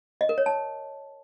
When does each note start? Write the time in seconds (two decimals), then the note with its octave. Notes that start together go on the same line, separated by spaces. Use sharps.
0.21 D#5
0.29 A#4
0.38 C#5
0.46 A5